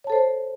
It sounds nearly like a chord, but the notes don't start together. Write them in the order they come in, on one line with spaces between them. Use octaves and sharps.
C#5 A5 A4 C5